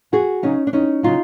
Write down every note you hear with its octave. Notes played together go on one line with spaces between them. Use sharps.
F2 F#4 G#4
C#3 F#3 C#4 D#4
D4
F2 C#4 D#4
C#3 F#3 D#4 F4